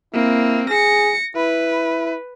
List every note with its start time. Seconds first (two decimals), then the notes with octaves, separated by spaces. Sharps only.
0.14 A#3 C4 E4
0.70 G#4 A#6 C#7
1.36 E4 B4